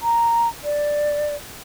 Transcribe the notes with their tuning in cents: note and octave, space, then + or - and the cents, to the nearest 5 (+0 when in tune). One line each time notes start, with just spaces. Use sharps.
A#5 +0
D5 +5